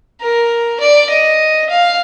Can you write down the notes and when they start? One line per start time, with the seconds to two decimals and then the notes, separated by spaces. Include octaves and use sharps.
0.21 A#4
0.81 D5
1.10 D#5
1.70 F5